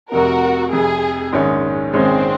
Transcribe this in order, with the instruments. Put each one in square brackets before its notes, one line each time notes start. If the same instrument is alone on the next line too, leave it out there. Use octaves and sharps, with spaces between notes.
[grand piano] F1 F2 C3 [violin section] F#4 A#4
[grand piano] F1 F2 C3 [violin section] G#4
[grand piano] A#1 G#2 D#3 G#3 C#4
[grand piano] A#1 G#2 D#3 G#3 C#4 [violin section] C4